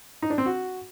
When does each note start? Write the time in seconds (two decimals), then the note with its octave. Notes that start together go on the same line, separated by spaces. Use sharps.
0.22 D#4
0.30 D4
0.38 C4
0.46 F#4